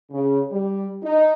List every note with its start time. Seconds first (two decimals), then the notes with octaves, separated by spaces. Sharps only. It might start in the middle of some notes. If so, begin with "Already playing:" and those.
0.11 C#3
0.52 G3
1.03 D#4